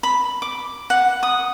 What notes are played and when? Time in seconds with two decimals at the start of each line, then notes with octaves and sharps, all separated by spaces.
0.03 B5
0.42 D6
0.90 F#5
1.23 D#6